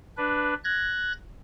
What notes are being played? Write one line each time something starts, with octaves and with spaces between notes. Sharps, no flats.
D4 B4
F#6 G#6 A#6